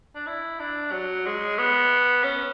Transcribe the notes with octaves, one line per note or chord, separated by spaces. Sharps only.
D4
E4
D4
F#3
G#3
B3
C#4